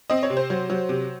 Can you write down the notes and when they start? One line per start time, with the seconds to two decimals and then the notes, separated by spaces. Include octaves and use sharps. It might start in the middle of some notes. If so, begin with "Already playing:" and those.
0.10 C4 D#5
0.23 C#5
0.30 C3
0.37 C5
0.50 F#3
0.70 F#3
0.89 C3